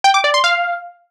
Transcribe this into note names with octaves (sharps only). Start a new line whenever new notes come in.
G5
D6
D5
C6
F5